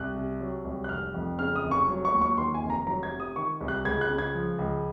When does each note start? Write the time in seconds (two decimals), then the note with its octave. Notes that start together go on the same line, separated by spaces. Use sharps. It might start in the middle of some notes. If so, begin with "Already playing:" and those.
Already playing: C2 F#6
0.15 C3
0.41 F#3
0.64 C2
0.84 F#6
0.89 F1 F6
1.14 F2
1.39 C#3 F6
1.56 D#6
1.64 F1
1.71 C#6
1.88 F#3
2.05 C#6
2.13 D#2
2.21 C#6
2.38 D#3 C6
2.54 G#5
2.63 F1
2.70 A#5
2.86 F#3 A#5
3.03 G#6
3.11 C3
3.20 D#6
3.36 D#3 C#6
3.61 C2
3.68 F#6
3.85 C#2 G#6
4.01 F#6
4.10 C#3
4.18 G#6
4.35 F3
4.59 C#2